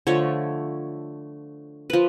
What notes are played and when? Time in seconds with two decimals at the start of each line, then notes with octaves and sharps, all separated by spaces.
0.07 D3 F3 A3 C#5
1.90 F3 B4